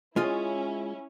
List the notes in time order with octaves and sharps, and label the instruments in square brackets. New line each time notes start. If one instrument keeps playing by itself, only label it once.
[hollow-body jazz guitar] G#3 F4 D#5 [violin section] C#4 E4